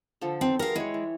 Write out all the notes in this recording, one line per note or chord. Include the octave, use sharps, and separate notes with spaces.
D3 F3 A4
C4 D#4
F#3 G#3 A#4 F5
G#3 E4 C#5
E3